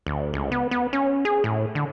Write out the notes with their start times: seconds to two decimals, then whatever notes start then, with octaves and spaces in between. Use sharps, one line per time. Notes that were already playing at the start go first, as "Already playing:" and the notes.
0.07 D2
0.34 C#2
0.52 B3
0.71 B3
0.93 C#4
1.25 G#4
1.44 A2
1.75 D3